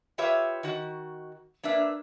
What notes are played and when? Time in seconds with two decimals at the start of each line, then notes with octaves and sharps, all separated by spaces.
0.18 F4 G4 B4 C#5 E5
0.63 D#3 F#4
1.63 A#3 D4 B4 E5